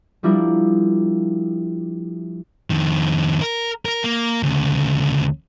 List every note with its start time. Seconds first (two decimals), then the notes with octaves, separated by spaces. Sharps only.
0.23 F3 G3 D4 E4 A#4
2.70 F2 D#3
3.42 A#4
3.85 A#4
4.04 A#3
4.43 D2 C#3